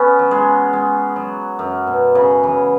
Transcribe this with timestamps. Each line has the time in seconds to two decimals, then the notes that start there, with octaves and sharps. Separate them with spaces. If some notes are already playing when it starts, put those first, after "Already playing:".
Already playing: B3 C#4
0.19 F#3
0.31 G#3
0.73 G#3
1.16 F#3
1.59 F#2
1.87 B2
2.15 C#3
2.43 E3